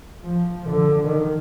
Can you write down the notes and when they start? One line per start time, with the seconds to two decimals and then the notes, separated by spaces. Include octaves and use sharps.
0.24 F3
0.70 D3
1.07 D#3